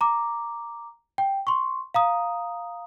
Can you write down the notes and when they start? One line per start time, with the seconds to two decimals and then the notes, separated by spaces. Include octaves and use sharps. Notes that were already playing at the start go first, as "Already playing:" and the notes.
0.01 A#5 D6
1.18 G5
1.47 C6 C#6
1.94 F5 A#5 D#6